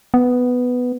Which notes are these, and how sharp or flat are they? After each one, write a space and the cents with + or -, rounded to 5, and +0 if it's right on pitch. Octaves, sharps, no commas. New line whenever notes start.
B3 +5